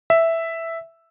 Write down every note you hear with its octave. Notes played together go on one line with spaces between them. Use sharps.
E5